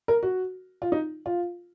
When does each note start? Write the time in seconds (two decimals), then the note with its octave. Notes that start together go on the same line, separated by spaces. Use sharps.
0.08 A#4
0.23 F#4
0.82 F4
0.92 D#4
1.26 F4